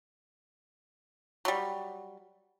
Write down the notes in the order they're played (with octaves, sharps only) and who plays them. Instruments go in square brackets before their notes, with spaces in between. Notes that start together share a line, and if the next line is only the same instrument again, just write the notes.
[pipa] F#3 G3